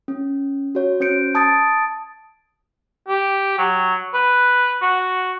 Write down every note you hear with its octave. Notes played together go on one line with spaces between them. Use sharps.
C#4
F#4 C#5
C#4 C5 G6 C#7 D7
A5 D#6 G#6 A6 D7
G4
F#3
B4
F#4